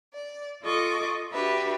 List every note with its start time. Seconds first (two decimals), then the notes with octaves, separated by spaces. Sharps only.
0.15 D5
0.63 F4 A4 D#5 C#6 D6
1.32 D4 F#4 G4 B4 E5